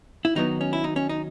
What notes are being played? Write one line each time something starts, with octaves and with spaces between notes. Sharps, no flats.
E4
D#3 F#3 B3 D#4
C#4
E4
D#4
C#4
D#4